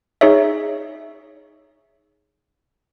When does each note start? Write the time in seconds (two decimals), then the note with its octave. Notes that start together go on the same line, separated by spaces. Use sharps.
0.21 D#4 G#4 C#5 E5